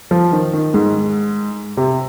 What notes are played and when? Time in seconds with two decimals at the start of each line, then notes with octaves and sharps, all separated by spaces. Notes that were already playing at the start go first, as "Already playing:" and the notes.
0.11 F3
0.32 D#3
0.53 D#3
0.74 G#2
1.77 C3